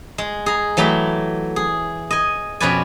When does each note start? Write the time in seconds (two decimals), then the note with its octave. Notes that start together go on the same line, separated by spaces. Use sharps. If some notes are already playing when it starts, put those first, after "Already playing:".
0.18 G#3
0.46 G#4 A#5
0.77 E3 F#3 A3 G4 B5
1.56 G#4
2.11 D#5 G#5
2.60 F2 B2 C#4 B4 D5 G#5